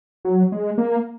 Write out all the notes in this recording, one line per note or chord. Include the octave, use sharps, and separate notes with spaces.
F#3
G#3
A#3